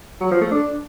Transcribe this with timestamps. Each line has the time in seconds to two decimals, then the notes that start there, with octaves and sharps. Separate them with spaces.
0.21 F#3
0.31 F3
0.41 A3
0.52 D4